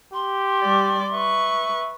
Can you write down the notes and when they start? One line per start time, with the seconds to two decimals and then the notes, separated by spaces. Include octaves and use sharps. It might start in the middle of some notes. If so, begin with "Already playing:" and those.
0.13 G4 C6
0.61 G3 D5
1.13 B4 E5 C#6